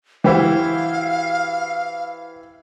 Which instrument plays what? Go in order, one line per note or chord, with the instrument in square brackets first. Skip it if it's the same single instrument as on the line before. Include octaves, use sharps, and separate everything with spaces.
[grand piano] E3 E4 [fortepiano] F#4 G4 C5 [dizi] F5